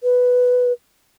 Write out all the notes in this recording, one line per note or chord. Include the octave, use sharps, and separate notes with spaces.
B4